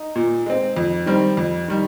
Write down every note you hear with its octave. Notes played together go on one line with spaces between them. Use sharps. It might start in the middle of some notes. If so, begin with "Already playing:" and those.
Already playing: D#4
A#2
G#3 C4
F2
D#3 G3 C4
F2
D#3 G3